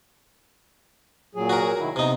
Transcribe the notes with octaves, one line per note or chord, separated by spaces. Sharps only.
A#2 F#3 G#4
F#4 A#4
D#3 E4
C3 B3 D#4